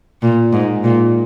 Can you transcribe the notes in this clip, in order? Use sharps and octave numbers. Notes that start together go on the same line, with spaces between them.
A#2
G#2
A#2